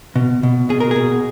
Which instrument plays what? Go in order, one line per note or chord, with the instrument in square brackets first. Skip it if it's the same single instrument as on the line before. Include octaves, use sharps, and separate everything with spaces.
[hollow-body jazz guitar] B2
B2
B2 G#4
A#4
B2 G#4